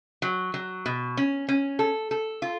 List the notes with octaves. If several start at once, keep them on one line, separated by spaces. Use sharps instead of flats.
F#3
F#3
B2
C#4
C#4
A4
A4
F4